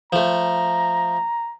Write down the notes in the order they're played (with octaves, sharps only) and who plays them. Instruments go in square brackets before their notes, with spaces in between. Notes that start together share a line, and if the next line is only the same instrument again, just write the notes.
[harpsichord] F3 A3 [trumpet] A#5